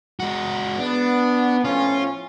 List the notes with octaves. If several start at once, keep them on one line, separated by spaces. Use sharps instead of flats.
G#3 F#4
B3 D4
A2 F3 C#4 F4